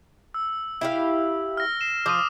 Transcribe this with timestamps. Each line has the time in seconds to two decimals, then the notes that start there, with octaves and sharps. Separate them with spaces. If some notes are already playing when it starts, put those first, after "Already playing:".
0.34 E6
0.81 E4 G4 F5
1.57 F6 A#6
1.81 C7 E7
2.06 F3 D6 D#6 D#7